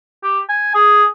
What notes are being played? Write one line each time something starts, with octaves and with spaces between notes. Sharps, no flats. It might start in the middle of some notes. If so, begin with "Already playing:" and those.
G4
G#5
G#4